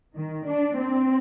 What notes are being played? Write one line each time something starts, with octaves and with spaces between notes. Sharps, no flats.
D#3
D4
C4